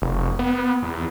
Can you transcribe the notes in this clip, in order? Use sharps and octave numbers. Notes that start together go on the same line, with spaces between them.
F1
B3
E2